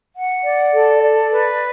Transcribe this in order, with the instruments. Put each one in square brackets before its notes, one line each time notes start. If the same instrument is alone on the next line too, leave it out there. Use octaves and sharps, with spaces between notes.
[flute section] F#5
D5
A4
D5
B4